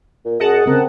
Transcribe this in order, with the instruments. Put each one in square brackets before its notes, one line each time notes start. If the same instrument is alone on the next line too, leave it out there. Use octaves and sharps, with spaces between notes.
[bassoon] A#2
[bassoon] F#2 [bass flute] G#4 [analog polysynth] D#5 F#5 A5
[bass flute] C#3 [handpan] C4 [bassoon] A#4